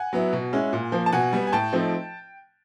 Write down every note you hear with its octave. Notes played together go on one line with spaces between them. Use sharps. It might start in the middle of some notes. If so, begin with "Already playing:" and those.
Already playing: F#5 G#5
F#3 B3 E4
B2
G#3 C#4 E4
A#2
F3 A#3
A5
B2 F#5 G#5
G3 B3
G#5
A2 G5 A5
F3 A3 C4 D#4